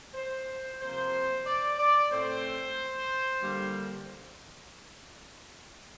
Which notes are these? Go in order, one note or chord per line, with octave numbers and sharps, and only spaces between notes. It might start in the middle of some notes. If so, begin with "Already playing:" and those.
C5
C3 F3 A#3 C5
D5
D5
A2 A3 C4 C5
G2 D3 G3 A#3